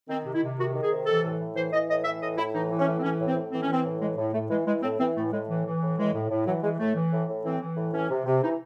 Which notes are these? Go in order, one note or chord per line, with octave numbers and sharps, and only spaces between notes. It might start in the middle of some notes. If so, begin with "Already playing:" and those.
D#3 C4
C3
E4
C3
D#3 F#4
D#3
G#4
C3
E3 A4
A2
A2
E3 C5
E3 D#5
A2 D#5
E3 E5
A2 D#5
A2 E4
E3 D#4
E3
C#4
A2
C4
E3 C#4
A2
C4
A2
E3 C4
C#4
E3 C4
A2
E3 G#3
A2
A2 A3
E3 G#3
E3 G#3
A2 C4
E3 C4
A2 A3
A2 G#3
E3
E3
A2
E3 G#3
A2
A2
E3 F#3
E3 G#3
A2 A3
E3
A2
A2
E3 C4
E3
A2
E3 C#4
C3
C3
E3 D#4